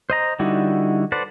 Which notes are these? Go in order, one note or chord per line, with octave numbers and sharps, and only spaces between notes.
C5 D#5 A#5
D3 G3 D#4 E4 F#4
A4 B4 C5 D5 F#5